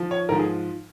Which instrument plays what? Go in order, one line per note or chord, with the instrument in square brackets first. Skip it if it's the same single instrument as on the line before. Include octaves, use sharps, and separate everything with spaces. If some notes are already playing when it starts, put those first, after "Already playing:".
Already playing: [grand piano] F3
C#5
G#2 F3 A#4
G#4